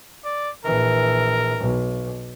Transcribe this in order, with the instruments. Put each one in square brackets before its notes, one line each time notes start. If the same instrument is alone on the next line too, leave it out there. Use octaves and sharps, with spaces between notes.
[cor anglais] D5
[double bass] A#1 E3 [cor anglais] A#4
[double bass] B1